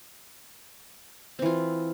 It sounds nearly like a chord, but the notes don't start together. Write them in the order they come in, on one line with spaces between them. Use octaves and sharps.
C4 E3 F4